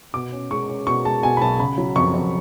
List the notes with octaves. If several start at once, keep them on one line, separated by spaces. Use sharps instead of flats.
B2 D6
C#4
G#3 C#6
C#4
B2 C#6
G#3 A5
B2 G#5
B5
B1 A5
C#3 B5
F#3
F2 C#6
F2